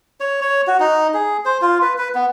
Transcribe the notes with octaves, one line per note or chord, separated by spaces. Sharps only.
C#5
C#5
F#4
D#4
G#4
C5
F4
B4
B4
B3